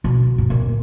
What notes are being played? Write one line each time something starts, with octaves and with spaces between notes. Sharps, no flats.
B2
G#2
A#2